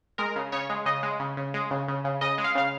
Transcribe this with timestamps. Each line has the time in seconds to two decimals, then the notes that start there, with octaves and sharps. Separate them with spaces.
0.18 G#3 A#4
0.36 C#3
0.52 C#3 C#5
0.70 G#3
0.86 C#3 D#5
1.03 G#3
1.20 C#3
1.37 C#3
1.54 G#3
1.71 C#3
1.88 C#3
2.04 C#3
2.21 C#3 D#5
2.38 G#3
2.44 F5
2.55 C#3 F5